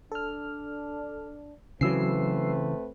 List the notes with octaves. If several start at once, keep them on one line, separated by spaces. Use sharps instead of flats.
D4 A4 F6
C#3 E3 F#3 A3 C4 B4 E6 C7